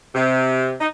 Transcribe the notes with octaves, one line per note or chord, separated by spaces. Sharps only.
C3
D#4